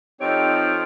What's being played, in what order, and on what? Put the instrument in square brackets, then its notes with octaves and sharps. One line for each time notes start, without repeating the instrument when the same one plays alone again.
[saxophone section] F3 A4 C#5 [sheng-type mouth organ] C4 D#4 G4 [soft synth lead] D7